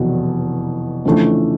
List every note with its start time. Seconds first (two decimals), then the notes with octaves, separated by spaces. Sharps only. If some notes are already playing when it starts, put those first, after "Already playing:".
Already playing: F1 E2 B2 F#3
1.05 F2 C#3 E3 A3 D4